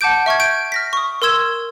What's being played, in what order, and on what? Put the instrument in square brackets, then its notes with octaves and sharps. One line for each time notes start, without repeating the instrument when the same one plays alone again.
[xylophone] F#5 A5 D6 G6 D7
E5 C#6 F6 G#6
G6 D7
F6 A#6 B6
C#6 D#6
A#4 C6 E6 G#6 E7